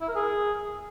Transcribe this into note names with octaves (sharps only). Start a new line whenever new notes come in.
E4
A#4
G#4